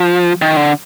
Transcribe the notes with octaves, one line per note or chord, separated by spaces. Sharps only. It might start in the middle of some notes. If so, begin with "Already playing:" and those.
Already playing: F3
D#3
D3